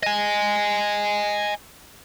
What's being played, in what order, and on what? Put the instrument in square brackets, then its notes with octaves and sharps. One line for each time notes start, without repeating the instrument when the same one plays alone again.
[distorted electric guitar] D#5 G#5